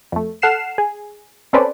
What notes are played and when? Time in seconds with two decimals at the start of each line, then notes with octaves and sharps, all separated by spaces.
0.12 F2 A3
0.42 A4 F#5 F6 C7 E7
0.78 G#4
1.53 C4 C#4 A4 B4 C5 D5